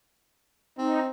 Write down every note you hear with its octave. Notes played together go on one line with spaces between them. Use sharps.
C4 D#4